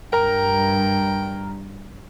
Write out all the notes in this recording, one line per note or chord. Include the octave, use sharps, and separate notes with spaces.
G2 A#4 G5 A#5